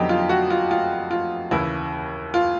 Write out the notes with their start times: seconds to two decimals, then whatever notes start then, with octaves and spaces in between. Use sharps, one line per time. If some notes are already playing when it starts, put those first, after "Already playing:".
Already playing: F2 D3 F#3 B3 D#4 G4
0.09 F4
0.29 F#4
0.50 F4
0.71 F4
1.11 F4
1.51 D#2 C#3 E3 E4
2.34 F4